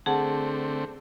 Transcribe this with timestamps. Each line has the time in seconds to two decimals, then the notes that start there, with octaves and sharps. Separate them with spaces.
0.06 D3 A3 C4 G#4 F#5 A5